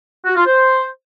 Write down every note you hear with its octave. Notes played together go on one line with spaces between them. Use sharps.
F#4
F4
C5